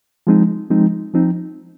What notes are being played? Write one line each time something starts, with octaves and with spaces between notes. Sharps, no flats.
F3 G#3 C4 D#4
F3 G#3 C4 D#4
F3 C4 D#4